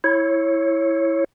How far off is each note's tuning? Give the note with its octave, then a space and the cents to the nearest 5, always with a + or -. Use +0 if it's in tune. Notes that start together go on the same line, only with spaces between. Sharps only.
E4 +0 C#5 -15